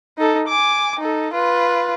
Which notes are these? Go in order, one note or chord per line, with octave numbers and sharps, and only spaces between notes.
D#4 A4
G#5 D6
D#4 A4
F4 B4